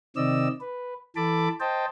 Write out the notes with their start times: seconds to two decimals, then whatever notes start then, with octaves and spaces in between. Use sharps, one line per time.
0.16 C3 D#3 C4 D5 D#5 E6
0.61 B4
1.16 E3 A4 A5 B5 D6
1.60 C5 D#5 G5 A5